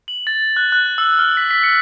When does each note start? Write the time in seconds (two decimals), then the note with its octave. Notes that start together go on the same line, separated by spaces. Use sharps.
0.08 F#7
0.27 A6
0.56 F#6
0.72 F#6
0.98 E6
1.19 F6
1.37 B6
1.51 B6
1.63 C#7